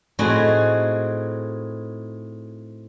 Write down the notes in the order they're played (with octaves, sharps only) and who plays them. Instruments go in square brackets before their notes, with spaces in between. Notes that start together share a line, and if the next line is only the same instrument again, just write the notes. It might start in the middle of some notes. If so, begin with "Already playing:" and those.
[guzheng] A2 C4 D#4 F#4 G#4